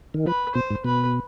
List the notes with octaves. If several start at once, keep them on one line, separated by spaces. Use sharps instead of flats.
D#3
F3 B4
B2 C5
G#2
B2 B4